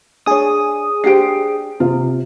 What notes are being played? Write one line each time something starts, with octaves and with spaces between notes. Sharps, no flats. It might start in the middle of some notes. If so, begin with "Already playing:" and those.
D4 G#4 C#5 D#6
D4 G4 C5 C7 D7
C3 F4